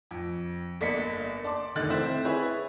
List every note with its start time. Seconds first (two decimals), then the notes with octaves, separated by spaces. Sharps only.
0.11 F2
0.81 G1 A#3 D5 D#5 B6 C#7
1.44 D5 A5 C6 D6
1.76 F1 D3 D#3 D#5 F#6 A6
1.90 C4 E4 C5 E5
2.24 E4 G#4 B4 C#5 E5